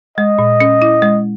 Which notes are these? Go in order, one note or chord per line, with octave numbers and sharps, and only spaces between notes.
G#3 D#5
A#2
C#4
E4
G#3